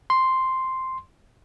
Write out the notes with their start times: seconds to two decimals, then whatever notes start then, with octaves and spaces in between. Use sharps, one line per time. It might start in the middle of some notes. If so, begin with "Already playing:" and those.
0.10 C6